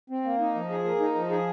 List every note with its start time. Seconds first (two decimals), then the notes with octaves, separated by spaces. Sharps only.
0.10 C4
0.24 A#3
0.39 D#4
0.55 F3
0.69 G#4
0.84 A#3
1.00 D#4
1.15 F3
1.30 G#4